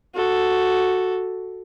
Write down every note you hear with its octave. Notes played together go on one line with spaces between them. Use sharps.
F#4 A4